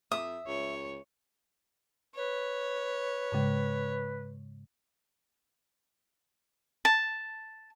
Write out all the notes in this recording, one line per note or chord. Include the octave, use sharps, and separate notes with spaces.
F2 E5 D#6
C#2 C#5
B4 C#5
G#2 C#3 G#3
A5